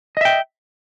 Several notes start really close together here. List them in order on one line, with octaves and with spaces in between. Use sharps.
D#5 E5 G5